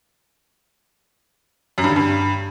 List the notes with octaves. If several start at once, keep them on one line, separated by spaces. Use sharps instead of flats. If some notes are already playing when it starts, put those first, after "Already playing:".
F#2
G2
D3
G2